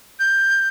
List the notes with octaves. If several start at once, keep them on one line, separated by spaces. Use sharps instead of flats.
G6